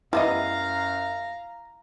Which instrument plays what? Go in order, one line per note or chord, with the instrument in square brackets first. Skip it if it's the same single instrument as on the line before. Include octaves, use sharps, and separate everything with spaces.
[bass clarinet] F#2 [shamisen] G3 B3 D#5 [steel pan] E4 [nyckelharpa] F5 A#5